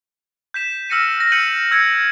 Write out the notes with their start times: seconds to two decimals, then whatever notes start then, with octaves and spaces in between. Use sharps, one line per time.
0.54 G6 B6 E7
0.90 E6 F6 A#6 C#7 D#7
1.20 A#6
1.32 E6 G6 C#7 D#7 F#7
1.71 E6 G6 G#6 C#7 D7